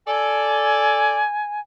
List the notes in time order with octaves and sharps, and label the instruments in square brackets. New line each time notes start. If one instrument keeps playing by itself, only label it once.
[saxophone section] A4 D5 [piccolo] G#5